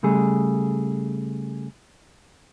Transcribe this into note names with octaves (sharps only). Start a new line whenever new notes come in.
C#3 G3 A3 G#4